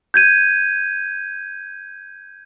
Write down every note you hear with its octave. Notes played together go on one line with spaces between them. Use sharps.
G6 G#6 D#7